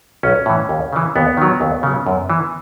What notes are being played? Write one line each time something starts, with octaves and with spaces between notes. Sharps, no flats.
B1 C#4
A2 E3
D#2
C#3 E3
D#2 B3
D#3 F#3
D#2
C#3 F#3
F#2
E3